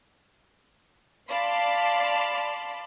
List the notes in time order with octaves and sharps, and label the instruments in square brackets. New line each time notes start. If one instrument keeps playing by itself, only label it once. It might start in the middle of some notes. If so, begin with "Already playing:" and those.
[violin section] D5 F5 A5 B5 C6